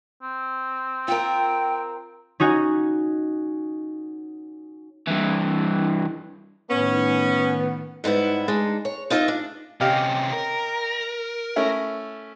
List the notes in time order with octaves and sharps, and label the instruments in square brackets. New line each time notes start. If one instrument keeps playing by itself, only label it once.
[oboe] C4
[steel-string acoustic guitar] F4 A#4 [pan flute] G5
[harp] C#4 D#4 F#4 G#5
[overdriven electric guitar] G2 E3
[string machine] A2 D#3 [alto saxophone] B3 [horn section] C#4
[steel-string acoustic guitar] G#2 G3 B3 E4
G#3 D4 D#4
C#5
D#4 F4 A4 C#5 D#5 E5
D4
[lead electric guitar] C3 C#4 [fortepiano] G4 D#5 F5
[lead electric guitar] A#4
[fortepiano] A3 C#4 E4